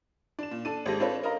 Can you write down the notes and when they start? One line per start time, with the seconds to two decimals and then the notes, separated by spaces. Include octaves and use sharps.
0.39 D4 E7
0.51 A#2
0.65 D4 A4 D#7
0.86 G#1 G#3 G4 A4 A#6
1.00 C4 D4 F4 A4 B4 C#5
1.23 A#4 D#5 F5 A#5